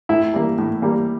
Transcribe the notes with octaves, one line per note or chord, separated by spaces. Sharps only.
A2 E4
G3 A#3
A2
G3 A#3